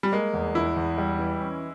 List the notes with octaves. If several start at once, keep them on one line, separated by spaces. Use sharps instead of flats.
G3
G#3 A#3
E2
E2 E4
E2
G3
E3
C#4